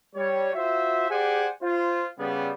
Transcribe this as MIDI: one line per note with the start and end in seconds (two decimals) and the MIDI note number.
0.15 0.50 55
0.15 0.50 73
0.55 1.09 65
0.55 1.09 66
0.55 1.09 72
0.55 1.09 76
1.10 1.49 67
1.10 1.49 68
1.10 1.49 72
1.10 1.49 74
1.10 1.49 78
1.10 1.49 80
1.62 2.06 65
1.62 2.06 72
2.19 2.51 49
2.19 2.51 55
2.19 2.51 59